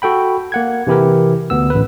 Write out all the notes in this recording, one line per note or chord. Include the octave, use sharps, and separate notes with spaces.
F#4 A4 G5 B5
A#3 F#5 G#6
C3 E3 E4 G4 A#4
D2 B3 E6
A1 B4